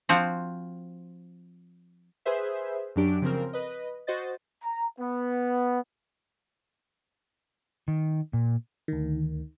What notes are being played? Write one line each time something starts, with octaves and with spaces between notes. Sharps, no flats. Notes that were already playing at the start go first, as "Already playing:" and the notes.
F3 C4 F#4
G#4 B4 C5 E5
F#2 F#3 D4 G4 D7
C#3 F3 C4 A#4
B4 D#5
F#4 C5 D#5 A6
A#5
B3
D#3
A#2
D2 D#3